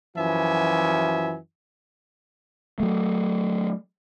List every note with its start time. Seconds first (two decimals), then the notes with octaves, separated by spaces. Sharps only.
0.16 F#2 E3 F3 F#4 E5 G#5
2.80 F#3 A3